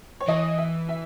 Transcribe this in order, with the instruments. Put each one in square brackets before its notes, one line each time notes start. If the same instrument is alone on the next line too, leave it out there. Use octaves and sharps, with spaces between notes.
[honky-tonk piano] C#5
[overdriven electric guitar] E3 [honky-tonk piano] D#5
[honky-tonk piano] E5
E5